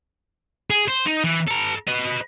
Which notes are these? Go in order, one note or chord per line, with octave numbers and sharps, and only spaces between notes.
G#4
C5
D#4
E3
A4 A#5
B4 D#5